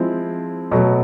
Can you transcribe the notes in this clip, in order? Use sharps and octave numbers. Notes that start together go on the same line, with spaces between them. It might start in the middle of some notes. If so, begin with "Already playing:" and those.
Already playing: F3 G#3 C4 E4
B2 F#3 A3